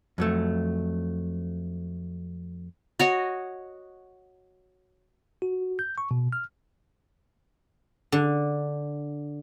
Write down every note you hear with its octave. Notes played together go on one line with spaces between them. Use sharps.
F2 F#3 A3
F#4 C#5 D#5
F#4
G6
C#6
B2
F6
D3